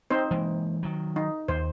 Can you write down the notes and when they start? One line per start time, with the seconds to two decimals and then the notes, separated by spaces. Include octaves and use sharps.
0.10 C4 D#4 C5
0.31 E3 G#3 A#3
0.83 D#3 F#3
1.16 D#4
1.48 D#2 C5